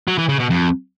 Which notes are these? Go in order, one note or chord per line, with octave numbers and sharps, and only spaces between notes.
F#3
E3
C#3
B2
F2